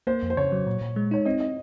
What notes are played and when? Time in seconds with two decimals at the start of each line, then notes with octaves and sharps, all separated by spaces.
0.07 A#3 C5
0.23 F2
0.30 C5
0.37 C#3 C#5
0.52 F#3
0.67 A#2
0.81 A#2
0.96 G#3
1.11 D#4 C#5
1.25 C4 D#5
1.40 D#5